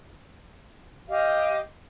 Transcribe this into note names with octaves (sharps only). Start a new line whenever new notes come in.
G4 D#5 F5